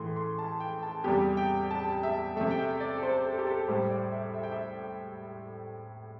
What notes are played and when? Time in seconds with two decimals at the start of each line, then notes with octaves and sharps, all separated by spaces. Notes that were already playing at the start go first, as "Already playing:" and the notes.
Already playing: A2 E3 A3 C6
0.16 C6
0.39 A5
0.60 G5
0.83 A5
1.04 E2 C3 G3 G4
1.37 G5
1.71 A5
2.03 E5
2.36 C3 A3 E5
2.51 G5
2.58 E5
2.80 D5
2.98 A4
3.03 C5
3.24 A4
3.39 G4
3.47 A4
3.68 A2 G3 C5
3.90 D5
4.12 E5
4.34 E5
4.43 G5
4.52 E5